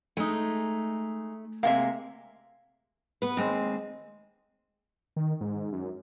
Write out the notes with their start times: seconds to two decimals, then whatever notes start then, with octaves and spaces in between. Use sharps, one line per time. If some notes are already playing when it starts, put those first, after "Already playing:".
0.17 G#3 A3 D#4
1.63 C3 G#3 A#3 E5 F5
3.22 B3 B4
3.37 D#2 G#3 C4
5.16 D#3
5.41 G#2
5.72 F#2